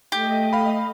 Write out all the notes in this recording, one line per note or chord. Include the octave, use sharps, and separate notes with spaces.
A3 G4 D#5
F5 B5